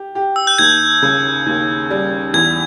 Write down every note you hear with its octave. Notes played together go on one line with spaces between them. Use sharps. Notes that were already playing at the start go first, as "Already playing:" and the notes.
Already playing: G4
G4
E6
G6
D#2 G#6
C#3
D#2
G3
E2 G#6